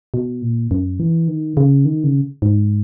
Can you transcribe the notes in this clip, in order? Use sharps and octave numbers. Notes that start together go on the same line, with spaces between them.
B2
A#2
F#2
E3
D#3
C#3
D#3
C#3
G#2